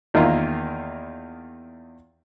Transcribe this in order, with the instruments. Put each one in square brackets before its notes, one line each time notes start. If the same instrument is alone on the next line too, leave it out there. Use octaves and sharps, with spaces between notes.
[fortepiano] E2 D#3 A#3 E4 F4 A#5